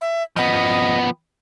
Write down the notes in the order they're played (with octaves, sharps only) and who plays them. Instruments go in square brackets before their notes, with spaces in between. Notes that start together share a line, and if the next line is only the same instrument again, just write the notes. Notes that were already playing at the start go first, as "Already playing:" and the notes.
[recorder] E5
[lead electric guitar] F3 B3 [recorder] D#5